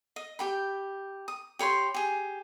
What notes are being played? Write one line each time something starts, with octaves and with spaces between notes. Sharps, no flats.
D#5
G4 G5 B5
D#6
G4 C#5 B5 C6
G4 G#4